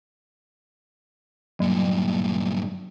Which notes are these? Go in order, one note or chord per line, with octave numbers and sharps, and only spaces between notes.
G2 A#2 F#3